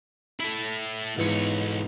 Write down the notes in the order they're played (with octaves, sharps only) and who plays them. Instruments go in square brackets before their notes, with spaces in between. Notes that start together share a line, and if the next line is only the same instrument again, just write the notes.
[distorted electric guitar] E4 A4
[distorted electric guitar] B1 C#5 [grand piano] G#2 E3